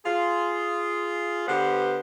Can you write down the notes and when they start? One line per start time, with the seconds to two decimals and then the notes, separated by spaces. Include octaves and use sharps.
0.05 F4 G#4
1.47 D3 B3 G4 B4 C5